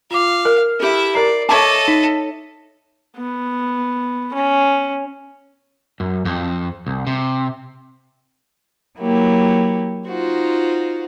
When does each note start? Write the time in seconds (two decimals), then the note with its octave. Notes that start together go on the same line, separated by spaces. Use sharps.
0.11 F4 F5 D6
0.45 A#4 F6
0.80 E4 G4 A4 E5
1.15 A#4 D5 A#5 C7
1.49 A4 C#5 D#5 E5 A5 C#6 D6
1.88 D#4 B6
3.17 B3
4.33 C#4
6.00 F#2
6.25 F2
6.87 C2
7.07 C3
8.97 F#3 A#3 E4 G4
10.07 D#4 F4 F#4 C5